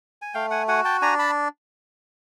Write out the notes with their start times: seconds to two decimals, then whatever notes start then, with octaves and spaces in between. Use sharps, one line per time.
0.22 G#5
0.34 A3 F5 G5
0.50 F#5 G#5
0.68 F#4 F#5 G#5
0.85 G5 A5
1.02 D4 G#5 A#5
1.19 A5 B5